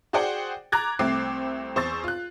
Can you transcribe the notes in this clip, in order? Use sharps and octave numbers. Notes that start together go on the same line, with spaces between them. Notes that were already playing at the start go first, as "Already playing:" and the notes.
F#4 G#4 C5 D5 F#5 G5
A#5 D6 F#6 G#6 A6
C2 A3 C4 D6 C7
E2 C5 C#6 E6 A6
F4 F#6